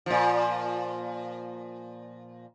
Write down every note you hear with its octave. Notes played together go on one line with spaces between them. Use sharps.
A#2 F3